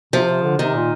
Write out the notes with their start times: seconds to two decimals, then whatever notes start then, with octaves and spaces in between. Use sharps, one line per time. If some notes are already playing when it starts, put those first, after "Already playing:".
0.13 C3 F3
0.28 C3
0.44 D3
0.59 C3 D#3
0.74 A#2